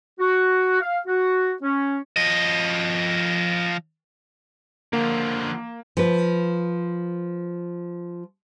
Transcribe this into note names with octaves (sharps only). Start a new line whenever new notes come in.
F#4
F5
F#4
C#4
F3 D#5
D3 F3 A#3
F3 B4